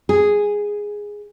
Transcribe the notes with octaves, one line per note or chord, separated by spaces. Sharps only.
G#4